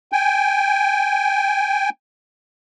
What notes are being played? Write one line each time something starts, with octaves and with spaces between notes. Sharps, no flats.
G5 G#5